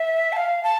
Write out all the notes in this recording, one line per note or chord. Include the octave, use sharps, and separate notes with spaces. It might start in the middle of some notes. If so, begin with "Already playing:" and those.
Already playing: E5
A5
F5
A5